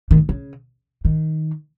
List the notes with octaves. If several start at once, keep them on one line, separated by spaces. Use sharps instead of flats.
D#3
C#3
D#3